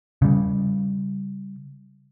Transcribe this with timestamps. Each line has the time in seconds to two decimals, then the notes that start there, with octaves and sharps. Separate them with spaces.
0.22 C#3 G3